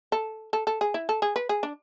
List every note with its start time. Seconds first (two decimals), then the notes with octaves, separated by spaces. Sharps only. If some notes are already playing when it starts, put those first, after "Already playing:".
0.12 A4
0.53 A4
0.67 A4
0.81 G#4
0.94 E4
1.09 A4
1.22 G#4
1.36 B4
1.49 G#4
1.63 D4